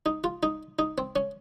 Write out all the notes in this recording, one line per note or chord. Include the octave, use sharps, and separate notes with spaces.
D#4
F4
D#4
D#4
C4
C#4